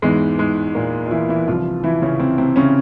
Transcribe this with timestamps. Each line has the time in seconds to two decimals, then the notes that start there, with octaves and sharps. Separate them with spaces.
0.02 E2 G#2 E3 G#3
0.39 G#2 G#3
0.75 A#2 A#3
1.06 F4
1.11 E3 E4
1.29 E3 E4
1.47 C2 C3 E3 F3 F4
1.84 E3 E4
2.02 C#3 C#4
2.20 C3 C4
2.38 C3 C4
2.56 C#3 C#4